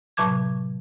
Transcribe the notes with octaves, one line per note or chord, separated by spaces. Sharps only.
A2 C3 F#3 A5 D6 G#6